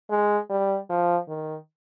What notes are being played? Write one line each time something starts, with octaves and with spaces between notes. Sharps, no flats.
G#3
G3
F3
D#3